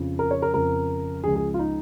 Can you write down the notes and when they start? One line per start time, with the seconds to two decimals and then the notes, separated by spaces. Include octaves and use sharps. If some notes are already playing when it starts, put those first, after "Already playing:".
Already playing: F2 C#3 F3
0.19 A#4
0.31 C#5
0.42 A#4
0.54 F2 C#3 F3 A#4
1.24 C#2 C#3 F3 G#4
1.36 G#4
1.54 F4
1.59 D#4